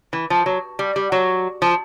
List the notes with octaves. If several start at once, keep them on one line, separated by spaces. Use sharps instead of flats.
E3
F3
F#3
G3
G3
F#3
F3